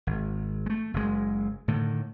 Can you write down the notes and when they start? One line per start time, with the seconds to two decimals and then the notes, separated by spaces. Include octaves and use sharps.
0.07 G#1
0.66 G#3 A3
0.94 F#1 F#2 A2 G#3
1.68 A2 D3 D#3